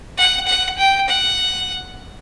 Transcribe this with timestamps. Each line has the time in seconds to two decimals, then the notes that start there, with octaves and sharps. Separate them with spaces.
0.17 F#5
0.47 F#5
0.78 G5
1.08 F#5